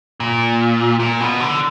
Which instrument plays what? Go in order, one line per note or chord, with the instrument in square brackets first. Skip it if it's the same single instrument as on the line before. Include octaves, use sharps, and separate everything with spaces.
[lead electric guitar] A#2
A#2
B2
D3